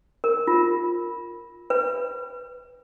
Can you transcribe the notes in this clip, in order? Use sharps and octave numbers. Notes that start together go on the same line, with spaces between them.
A#4
F4
B4